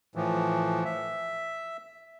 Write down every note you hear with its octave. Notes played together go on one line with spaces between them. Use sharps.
A2 E3 F3
E5